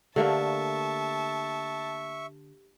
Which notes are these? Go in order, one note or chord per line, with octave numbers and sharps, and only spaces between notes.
D3 A3 A#3 G4 E5 A5 C#6